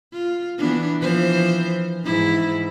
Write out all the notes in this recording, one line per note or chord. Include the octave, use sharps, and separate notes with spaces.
F4
E3 B3 D4
E3 F3 C5
G#2 E3 E4